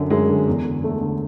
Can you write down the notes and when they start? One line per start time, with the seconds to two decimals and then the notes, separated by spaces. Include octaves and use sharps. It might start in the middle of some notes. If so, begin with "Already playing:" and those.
Already playing: F#2 D3
0.10 F#2 G#3
0.29 D3
0.48 E2
0.65 D3
0.84 E2 A3
1.02 D3